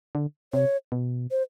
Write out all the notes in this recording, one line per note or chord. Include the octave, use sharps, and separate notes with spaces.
D3
C3 C#5
B2
C5